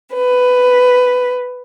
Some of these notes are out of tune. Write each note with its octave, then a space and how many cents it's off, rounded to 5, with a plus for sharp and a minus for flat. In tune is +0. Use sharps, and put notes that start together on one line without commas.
B4 +10